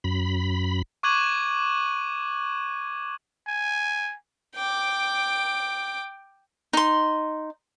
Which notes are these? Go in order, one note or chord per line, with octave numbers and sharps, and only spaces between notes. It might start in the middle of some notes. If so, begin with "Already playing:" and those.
F#2 B5
C#6 D6 F#6 G#6 D#7 F#7
G#5
G5 D6
D#4 C6